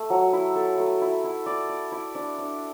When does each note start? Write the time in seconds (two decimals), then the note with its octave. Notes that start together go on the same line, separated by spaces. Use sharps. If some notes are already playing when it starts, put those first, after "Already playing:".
Already playing: A3
0.10 F#3
0.33 E4
0.56 A4
0.78 A3
1.02 E4
1.24 E4
1.46 D5
1.69 D5
1.92 E4
2.15 D4
2.38 D4